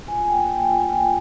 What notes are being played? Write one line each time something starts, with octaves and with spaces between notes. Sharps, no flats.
F4 G#5
A#3 G5
A#3 G5
F4 G#5
F4 G5